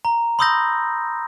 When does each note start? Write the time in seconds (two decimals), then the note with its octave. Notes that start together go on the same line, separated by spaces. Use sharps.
0.05 A#5
0.39 B5 C6 D#6 E6 G6 A#6